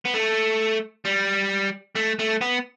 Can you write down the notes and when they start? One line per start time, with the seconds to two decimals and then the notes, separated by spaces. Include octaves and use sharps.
0.05 B3
0.14 A3
1.05 G3
1.96 A3
2.19 A3
2.41 B3